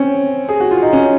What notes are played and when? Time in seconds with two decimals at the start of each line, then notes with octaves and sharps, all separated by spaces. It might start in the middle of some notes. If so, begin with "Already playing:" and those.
Already playing: C4 C#4
0.49 G#4
0.60 F#4
0.71 F4
0.82 D#4
0.93 C#4